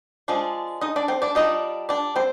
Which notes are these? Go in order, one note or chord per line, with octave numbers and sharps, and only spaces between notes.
F3 G#3 D4 F4
D#4 D#5
D4 D5
C4 C5
D4 D5
G3 D4 D#4 F4 D#5
D4 D5
C4 C5